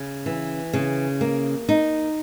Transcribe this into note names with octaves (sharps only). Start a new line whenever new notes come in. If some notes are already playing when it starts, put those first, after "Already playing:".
Already playing: C#3
E3
C#3
A#3
D#4